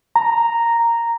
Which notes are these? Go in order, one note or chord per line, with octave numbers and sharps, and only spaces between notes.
A#5